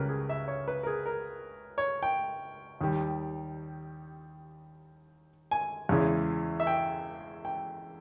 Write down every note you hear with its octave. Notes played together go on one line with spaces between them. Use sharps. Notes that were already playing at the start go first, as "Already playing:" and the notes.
Already playing: C#2 C#3 G3 A#4 B4
G#4
E5
C#5
B4
A#4
G#4
A#4
C#5
G5
D#2 D#3 G3
G#5
E2 C#3 E3 G#3
E5
G5
G5